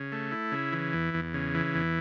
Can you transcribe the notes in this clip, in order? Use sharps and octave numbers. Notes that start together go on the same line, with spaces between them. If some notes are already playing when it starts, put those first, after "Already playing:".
Already playing: C#3
A3
E4
C#3
E3
E2
E2
C#3
E3
E2